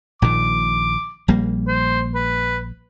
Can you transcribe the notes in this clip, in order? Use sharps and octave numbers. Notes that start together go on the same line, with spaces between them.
A#1 A#2 D#3 D6
A#1 G3 A#3
C5
B4